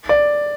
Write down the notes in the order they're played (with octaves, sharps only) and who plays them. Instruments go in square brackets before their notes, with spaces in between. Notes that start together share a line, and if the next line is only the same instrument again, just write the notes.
[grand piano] D5